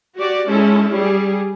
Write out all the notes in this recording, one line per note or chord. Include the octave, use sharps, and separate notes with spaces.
F#4 G4 D5
G#3 C#4 E4 A4
G3 G#4